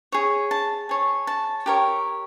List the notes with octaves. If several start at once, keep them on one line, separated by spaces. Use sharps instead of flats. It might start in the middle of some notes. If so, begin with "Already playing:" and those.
G#4 C#5
A5
G#4 C#5
A5
G4 A#4 C#5